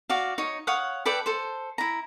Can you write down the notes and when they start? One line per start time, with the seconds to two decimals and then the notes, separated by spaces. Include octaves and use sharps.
0.09 F#4 D5 F5
0.38 D#4 C#5
0.67 C#5 F5 F#5 D#6
1.05 A4 B4 D5 G5
1.26 A4 C5
1.78 E4 A#5